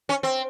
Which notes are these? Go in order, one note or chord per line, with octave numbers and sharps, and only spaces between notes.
C#4
C4